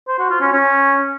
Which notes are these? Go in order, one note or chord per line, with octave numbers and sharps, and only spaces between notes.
C5
F#4
F4
C#4
C#4